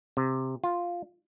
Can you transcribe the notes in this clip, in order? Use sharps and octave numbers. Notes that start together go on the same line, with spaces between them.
C3
F4